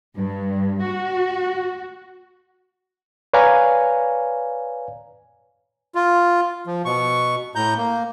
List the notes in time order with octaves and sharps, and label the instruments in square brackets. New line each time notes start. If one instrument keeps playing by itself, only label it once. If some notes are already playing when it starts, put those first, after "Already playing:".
[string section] G2
F#4
[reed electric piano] B4 C#5 D5 F5 G#5 A#5
[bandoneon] F4
F3
B2 C#6
A2 A#5 G6
A#3